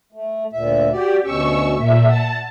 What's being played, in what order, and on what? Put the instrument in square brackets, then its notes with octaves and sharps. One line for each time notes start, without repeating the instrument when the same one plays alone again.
[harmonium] A3
D2 A#2 E5
[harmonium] F#4 D5 [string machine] G4
[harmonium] D2 B2 C#4 [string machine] C#6 E6
[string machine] A#2 E5
[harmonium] F#5 [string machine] A5